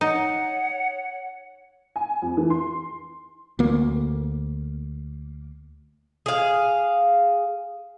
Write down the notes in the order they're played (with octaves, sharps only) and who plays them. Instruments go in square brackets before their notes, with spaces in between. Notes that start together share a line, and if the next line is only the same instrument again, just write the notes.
[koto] D#4 [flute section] C#5 F#5
[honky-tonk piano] G#5
F2
E3
C6
[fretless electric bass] D2 A#3
[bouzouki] G#4 F5